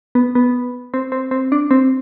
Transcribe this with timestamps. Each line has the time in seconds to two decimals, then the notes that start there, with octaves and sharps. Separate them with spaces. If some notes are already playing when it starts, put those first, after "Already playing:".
0.15 B3
0.35 B3
0.94 C4
1.12 C4
1.31 C4
1.52 D4
1.71 C4